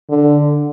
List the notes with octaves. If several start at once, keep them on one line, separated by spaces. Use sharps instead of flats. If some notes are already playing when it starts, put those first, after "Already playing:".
D3